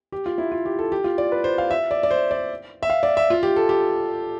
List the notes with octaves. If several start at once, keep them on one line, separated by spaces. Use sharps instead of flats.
G4
F4
E4
F4
G4
A4
G4
F4
D5
B4
C5
F5
E5
D5
D5
C5
D5
E5
F5
D5
E5
F4
G4
A4
G4